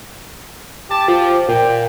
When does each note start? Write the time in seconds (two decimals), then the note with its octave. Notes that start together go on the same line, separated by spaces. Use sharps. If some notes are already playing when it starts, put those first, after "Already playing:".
0.91 G4 A5
1.08 F3
1.48 A#2 G5